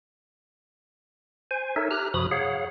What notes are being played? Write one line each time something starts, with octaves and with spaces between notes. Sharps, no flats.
C5 G#5
D#4 A4 A#4 C#5 E5
G4 A#5 F6 F#6
F#2 C3 F3 F#4 B5 D#6
G#4 C#5 F5 F#5